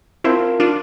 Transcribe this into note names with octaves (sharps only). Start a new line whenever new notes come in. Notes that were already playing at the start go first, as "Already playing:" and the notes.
C4 E4 F4 A#4 F5 A5
D4 F4